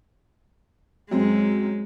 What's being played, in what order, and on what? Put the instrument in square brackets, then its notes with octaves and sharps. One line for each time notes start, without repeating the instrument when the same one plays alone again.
[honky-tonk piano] F#2 C4 [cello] G#3